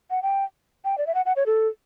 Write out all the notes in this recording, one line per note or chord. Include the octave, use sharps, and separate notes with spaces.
F#5
G5
G5
D5
E5
F#5
F#5
C#5
A4